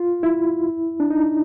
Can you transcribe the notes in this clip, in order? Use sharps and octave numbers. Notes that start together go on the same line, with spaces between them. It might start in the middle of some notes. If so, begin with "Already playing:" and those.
Already playing: F4
E4
D4
D#4